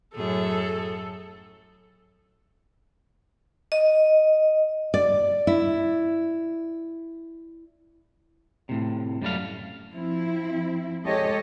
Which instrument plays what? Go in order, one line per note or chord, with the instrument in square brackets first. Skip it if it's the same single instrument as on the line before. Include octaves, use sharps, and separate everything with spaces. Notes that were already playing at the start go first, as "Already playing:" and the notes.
[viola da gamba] F#2 A2 G#4 [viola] A4
[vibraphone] D#5
[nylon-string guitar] D5
E4
[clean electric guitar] A2 C3
F#2 G3 A3 F5
[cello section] F3 C4 E4
G#3 G4 A4 C#5 D#5